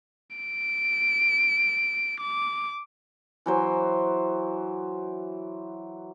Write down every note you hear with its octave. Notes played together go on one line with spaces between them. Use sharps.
D7
D6
E3 F#3 C5